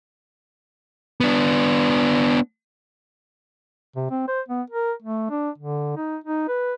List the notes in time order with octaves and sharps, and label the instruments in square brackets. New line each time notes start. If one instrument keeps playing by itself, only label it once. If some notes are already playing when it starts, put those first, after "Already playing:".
[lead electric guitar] B3 D4
[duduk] C3
C4
C5
B3
A#4
A3
D4
D3
D#4
D#4
B4